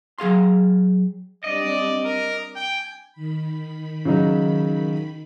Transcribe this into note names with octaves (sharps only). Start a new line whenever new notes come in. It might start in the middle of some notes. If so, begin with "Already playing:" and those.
F#3 G#4 F5 C6
G3 C4 D4 D5 D#5
A#4 D6
G5 G#5
D#3 B5
C#3 F#3 D#4